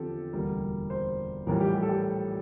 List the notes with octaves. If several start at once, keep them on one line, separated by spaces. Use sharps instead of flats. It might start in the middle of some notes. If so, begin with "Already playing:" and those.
Already playing: E2 D3 F3 C4 F4 G4 A4
E1 D2 D3 G3 A#3 A#4
C5
A#1 A2 E3 G3 A#4
G4
G4
A4
G4